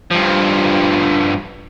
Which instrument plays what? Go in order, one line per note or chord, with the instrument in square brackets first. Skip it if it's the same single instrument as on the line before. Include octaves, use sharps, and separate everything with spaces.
[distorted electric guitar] G2 F3